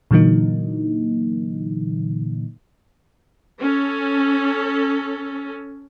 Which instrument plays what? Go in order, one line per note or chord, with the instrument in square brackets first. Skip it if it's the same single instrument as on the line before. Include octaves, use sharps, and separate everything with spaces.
[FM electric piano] A#2 D3 E3 F#3 A#3 D#4
[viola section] C#4 A4